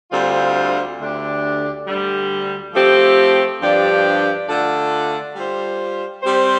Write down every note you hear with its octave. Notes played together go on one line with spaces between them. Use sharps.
D2 D3 G3 C4 F4
D2 D3 A3 D4 G4
D2 D3 G3
F3 A3 C4 G4
G2 F3 D4 G4 D5
D3 A3 F4 A4 D5
G3 F4 C5
G3 C4 G4 C5